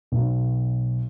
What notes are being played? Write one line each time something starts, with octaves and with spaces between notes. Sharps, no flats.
B1